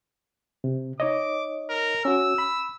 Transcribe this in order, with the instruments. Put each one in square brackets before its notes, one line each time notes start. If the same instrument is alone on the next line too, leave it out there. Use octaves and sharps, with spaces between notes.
[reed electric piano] C3
[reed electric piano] D#4 C#5 D#5 [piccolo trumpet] D6
[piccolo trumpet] A#4
[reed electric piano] C#4 F#4 [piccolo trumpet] E6
[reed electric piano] B5